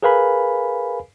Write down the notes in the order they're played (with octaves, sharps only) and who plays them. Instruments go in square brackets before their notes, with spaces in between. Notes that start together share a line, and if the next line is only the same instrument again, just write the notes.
[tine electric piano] G#4 A#4 B4 F5 G#5 B5